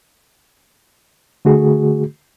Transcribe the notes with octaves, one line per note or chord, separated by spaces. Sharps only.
D3 A3 F#4 G#4